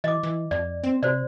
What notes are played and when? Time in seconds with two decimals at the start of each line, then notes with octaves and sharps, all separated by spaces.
0.04 E3 D#5 D6
0.23 E3
0.51 F2 D5
0.84 C4
1.03 C3 F#4 C5 D5